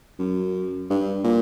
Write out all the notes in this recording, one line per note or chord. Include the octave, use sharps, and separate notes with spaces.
F#2
G2
A#2